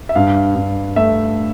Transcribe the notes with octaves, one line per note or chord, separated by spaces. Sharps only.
E5
G2 F5
G2
A3 E5